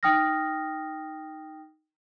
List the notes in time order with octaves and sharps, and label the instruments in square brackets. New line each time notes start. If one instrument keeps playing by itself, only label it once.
[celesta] D#4 G5 D#6 F6 A#6